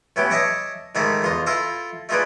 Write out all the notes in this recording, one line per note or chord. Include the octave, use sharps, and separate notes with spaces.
A2 B3 C#4 E4 G4
C#5 D#5 E5 A5 A#5 D6
G#2 D#3 A3 A4 D#5 B5
E2 F4 D#5
E4 F4 A4 F5 A5 A#5
A3 D#4 F4 G#4 B4 D5